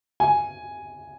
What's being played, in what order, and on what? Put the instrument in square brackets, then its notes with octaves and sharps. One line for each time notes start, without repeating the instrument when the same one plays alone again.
[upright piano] G#5